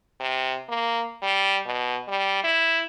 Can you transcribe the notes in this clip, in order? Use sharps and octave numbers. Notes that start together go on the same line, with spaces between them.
C3
A#3
G3
B2
G3
E4